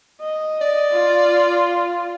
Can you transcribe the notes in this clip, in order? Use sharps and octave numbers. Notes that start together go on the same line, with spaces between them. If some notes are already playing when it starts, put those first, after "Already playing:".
D#5
D5
F4